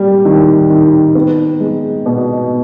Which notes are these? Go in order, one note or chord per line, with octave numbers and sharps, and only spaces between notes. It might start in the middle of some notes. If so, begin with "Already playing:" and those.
Already playing: G3 A#3
D#3
D#3
B3
G#3
B2